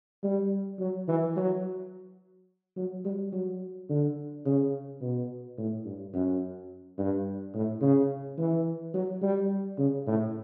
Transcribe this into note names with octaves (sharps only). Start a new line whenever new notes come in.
G3
F#3
E3
F#3
F#3
G3
F#3
D3
C#3
B2
A2
G2
F#2
G2
A2
C#3
E3
F#3
G3
C#3
A2